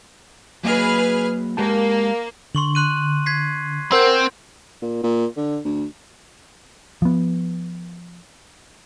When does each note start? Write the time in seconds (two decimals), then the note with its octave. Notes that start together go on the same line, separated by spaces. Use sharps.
0.64 F#3 A#3 G#4 B4 D#5 F6
1.57 G#3 A#3 G4 A5
2.55 D3 C6 C#6 F#7
2.75 C6 F#6 D#7
3.26 G#6 B6 C7
3.92 C4 A#4 C5 F#5 C6 G6
4.82 A#2
5.03 A#2
5.36 D3
5.65 D2
7.02 F3 B3